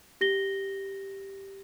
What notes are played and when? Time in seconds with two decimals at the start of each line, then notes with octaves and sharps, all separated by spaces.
0.21 G4 A#6 G7